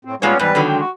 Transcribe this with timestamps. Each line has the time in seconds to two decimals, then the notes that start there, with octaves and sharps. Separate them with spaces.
0.05 A2 C4
0.22 A#2 G3 G#3 B3 C#4 C#5
0.39 E2 G#2 G3 B3 B4
0.55 D3 D#3 F#3
0.68 G#3 G5
0.80 F#4